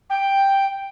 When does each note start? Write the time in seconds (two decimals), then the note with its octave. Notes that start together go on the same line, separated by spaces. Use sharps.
0.10 G5